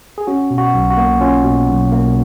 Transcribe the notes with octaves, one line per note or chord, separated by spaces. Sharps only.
G#4
C#4 F#4
B2
F#4
B1
F#4
A#3
C#4 F4
B2
B1
A#3